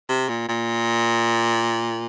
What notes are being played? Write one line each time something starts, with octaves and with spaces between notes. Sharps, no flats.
C3
A#2
A#2